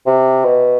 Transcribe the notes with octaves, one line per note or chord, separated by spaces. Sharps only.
C3
B2